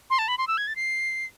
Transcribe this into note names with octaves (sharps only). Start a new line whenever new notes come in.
C6
A5
B5
C6
E6
G#6
A6
C7